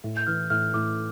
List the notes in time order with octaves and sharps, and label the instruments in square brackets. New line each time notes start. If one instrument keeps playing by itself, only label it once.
[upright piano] A2
[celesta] G6
[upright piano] E3 [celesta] F6
[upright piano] A2 [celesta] F6
[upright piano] A2 [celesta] D6